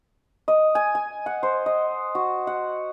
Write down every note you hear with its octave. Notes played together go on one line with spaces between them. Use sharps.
D#5
G#5
G#5
F#5
C5
D#5
F#4
F#5